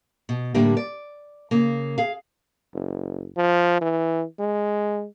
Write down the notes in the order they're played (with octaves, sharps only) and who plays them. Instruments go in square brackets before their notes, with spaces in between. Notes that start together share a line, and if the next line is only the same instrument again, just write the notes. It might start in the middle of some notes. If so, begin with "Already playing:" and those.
[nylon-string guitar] B2
A2 D3 G3 A#3 D4 G4
D5
C#3 A#3
G#4 F5
[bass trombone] F#1
F3
E3
G#3